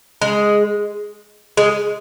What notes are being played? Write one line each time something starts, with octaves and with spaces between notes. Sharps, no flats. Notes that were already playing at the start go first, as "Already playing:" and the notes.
G#3
G#3